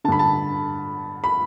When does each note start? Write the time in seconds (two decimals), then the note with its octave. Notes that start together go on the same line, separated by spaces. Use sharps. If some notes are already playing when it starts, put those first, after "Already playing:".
0.04 D3 A5
0.08 G2 B5
0.19 A5
1.24 B5